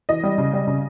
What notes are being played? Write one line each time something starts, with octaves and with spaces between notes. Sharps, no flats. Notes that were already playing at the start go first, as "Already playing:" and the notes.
E3 D#5
G3
C#3
G3
C#3